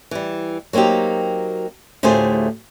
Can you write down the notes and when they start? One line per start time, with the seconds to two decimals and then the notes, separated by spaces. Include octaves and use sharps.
0.11 E3 G3
0.73 F#3 A#3 C4 D#4 G4
2.03 D2 A2 F4 G4 G#4 C5